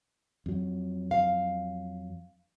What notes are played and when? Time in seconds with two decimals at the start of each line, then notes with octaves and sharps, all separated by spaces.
0.46 F2 F#3
1.11 F5